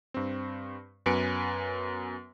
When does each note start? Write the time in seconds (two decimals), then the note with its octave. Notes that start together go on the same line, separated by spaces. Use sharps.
0.14 G2 C4
1.06 F#2 B3 B4 G#5 C#7 D7